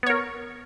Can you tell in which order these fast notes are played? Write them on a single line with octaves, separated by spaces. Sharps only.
B3 C#5 A#4